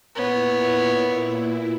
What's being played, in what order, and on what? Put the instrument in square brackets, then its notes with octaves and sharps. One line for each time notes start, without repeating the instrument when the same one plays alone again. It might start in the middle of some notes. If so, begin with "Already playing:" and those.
[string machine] A#2 E4 [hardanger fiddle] B3 C#5